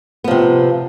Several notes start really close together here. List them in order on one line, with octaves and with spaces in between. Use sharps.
B3 F3 C3